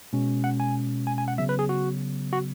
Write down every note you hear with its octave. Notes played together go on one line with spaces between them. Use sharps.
B2 G#3 C#4
F#5
G#5
G#5
G#5
F#5
C#3 F#3 B3 E5
B4
G#4
F#4
F#4